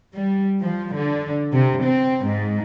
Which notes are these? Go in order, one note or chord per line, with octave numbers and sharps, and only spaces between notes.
G3
F3
D3
C3
C4
G#2